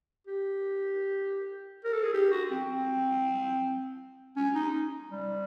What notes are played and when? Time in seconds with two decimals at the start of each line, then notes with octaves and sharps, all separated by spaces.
0.27 G4
1.84 A#4
1.93 A4
2.03 G#4
2.14 G4
2.31 F#4
2.51 C4
2.69 C4
4.36 C#4
4.55 D#4
5.11 G3